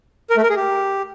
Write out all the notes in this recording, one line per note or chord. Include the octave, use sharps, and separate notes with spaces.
A#4
A3
A#4
G#4
G4